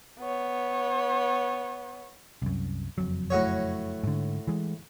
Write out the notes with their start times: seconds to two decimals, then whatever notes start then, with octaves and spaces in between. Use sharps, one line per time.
0.20 B3 C#5
2.42 C2 F#2
2.98 F#1 F2 F#3
3.30 A2 F#4 C#5
4.04 G#2 D3
4.47 E3 G#3